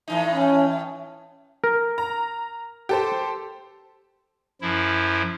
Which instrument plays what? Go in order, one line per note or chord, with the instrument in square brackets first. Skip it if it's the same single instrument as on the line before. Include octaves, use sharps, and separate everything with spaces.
[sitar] A2 E3 D#4
[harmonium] C#4
[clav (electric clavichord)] A#4
[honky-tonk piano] A#5
G4 A4 C5
[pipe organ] F#2 F3 E4